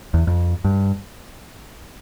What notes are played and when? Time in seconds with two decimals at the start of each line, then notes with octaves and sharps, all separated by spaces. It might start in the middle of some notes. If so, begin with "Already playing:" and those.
0.14 E2
0.27 F2
0.64 G2